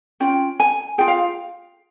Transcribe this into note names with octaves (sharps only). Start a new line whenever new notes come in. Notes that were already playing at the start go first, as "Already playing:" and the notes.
C#4 F4 G5
G#5
F4 G#4 G5
F5